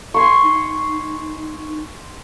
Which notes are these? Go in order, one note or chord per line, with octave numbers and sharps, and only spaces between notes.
G#5 C6 C#6
D#4